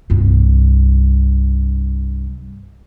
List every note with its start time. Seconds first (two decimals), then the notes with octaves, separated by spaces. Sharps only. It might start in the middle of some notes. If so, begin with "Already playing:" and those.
0.10 C2 G2